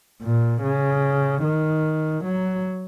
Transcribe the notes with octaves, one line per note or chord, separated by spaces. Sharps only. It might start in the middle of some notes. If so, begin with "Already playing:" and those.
A#2
C#3
D#3
F#3